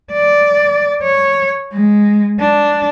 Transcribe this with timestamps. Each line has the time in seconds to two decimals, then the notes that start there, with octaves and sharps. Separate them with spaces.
0.12 D5
1.03 C#5
1.73 G#3
2.40 D4